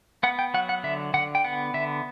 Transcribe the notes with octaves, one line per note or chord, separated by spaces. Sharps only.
B3 F#5
G5
F#3 F#5
F#5
D3 E5
D3 F#5
G5
B3 F#5
D3 E5